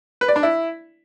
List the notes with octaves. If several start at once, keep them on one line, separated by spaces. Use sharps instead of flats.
B4
D5
D4
E4